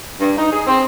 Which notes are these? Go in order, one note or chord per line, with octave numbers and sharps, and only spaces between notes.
G2
D#4
G#4
C4